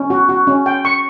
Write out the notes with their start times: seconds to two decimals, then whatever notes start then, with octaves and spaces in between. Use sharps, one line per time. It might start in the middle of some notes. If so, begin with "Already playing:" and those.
Already playing: C#4
0.10 F#4
0.29 F#4
0.47 C#4
0.66 G5
0.85 C#6